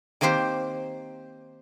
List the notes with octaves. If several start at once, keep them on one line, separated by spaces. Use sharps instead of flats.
D#3 A#3 C4 G4 C5